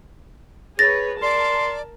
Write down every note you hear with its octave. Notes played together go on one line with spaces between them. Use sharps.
G#4 B4 C#5 A6 A#6
A#4 D5 A5 C6